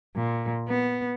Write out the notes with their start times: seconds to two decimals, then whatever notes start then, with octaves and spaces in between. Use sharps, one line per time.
0.16 A#2
0.68 B3